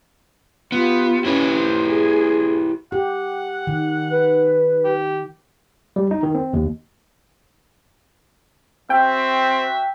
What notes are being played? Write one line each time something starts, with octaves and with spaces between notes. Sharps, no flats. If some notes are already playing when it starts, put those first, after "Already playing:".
B3 F4 G4
C#4 E4 G4 B4
C5
G#4
G4 F#5
D#3
B4
G4
G3
D#4
D#3
C4
D#2
C4 F#4 E5 G5